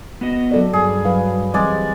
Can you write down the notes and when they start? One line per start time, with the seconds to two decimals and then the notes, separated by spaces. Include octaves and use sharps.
0.21 B3 F#4 D#5
0.51 F#3 A4 D5
0.73 G2 G#4
1.05 F#3 B4 F5
1.54 E3 G3 G#3 C4 D5 G#5